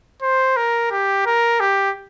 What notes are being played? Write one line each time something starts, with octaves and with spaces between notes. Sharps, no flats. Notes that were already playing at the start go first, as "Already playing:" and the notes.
C5
A#4
G4
A#4
G4